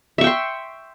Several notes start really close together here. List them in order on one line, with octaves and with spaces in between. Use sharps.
E5 C#6 G5 C6